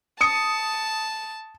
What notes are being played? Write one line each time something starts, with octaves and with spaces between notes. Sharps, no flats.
A5 D#6 C#7